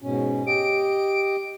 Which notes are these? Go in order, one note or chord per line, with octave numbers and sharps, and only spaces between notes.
G#2 B2 C#4
G4 D#5 D7